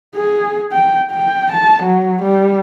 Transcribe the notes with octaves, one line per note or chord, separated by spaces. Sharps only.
G#4
G5
G5
A5
F#3
G3